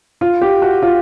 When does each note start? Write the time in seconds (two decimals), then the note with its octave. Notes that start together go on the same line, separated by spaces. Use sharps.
0.21 F4
0.41 G4
0.62 F#4
0.82 F4